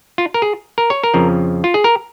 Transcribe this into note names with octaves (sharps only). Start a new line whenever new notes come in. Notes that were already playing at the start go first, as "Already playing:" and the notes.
F4
A#4
G#4
A#4
C#5
A#4
F2 C#3 F3
F4
G#4
A#4